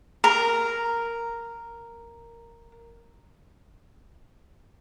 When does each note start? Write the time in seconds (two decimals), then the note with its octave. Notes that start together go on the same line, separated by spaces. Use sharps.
0.24 A#4